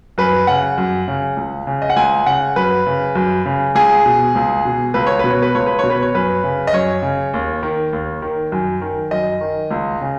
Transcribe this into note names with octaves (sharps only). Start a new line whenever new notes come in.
F#2 B4
C#3 F#5
F#2
C#3
C#2
C#3
D#5
F#5
C#2 G#5
C#3 F#5
F#2 B4
C#3
F#2
C#3
C#2 G#4
B2
C#2
B2
C#2 B4
C#5
B2 B4
C#5
B4
C#2 C#5
B4
B2 C#5
B4
C#5
F#2 B4
C#3
D#5
F#2 C#5
C#3
D#2
D#3
D#2
D#3
F#2
D#3
F#2 D#5
D#3
C#2
C#3